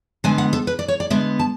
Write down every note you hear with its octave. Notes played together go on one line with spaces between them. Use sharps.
D3 G#3 B3 G#5
F#5
A4
B4
D5
C#5
D5
D3 G#3 B3 E5
A5